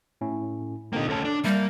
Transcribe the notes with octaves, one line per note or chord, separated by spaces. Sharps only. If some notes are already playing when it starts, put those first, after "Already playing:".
A2 C#4 E4
A#2 D3 A#3 C4 D#4
D2 C#4 A4 A5
D4
G3 A#3 E5 G6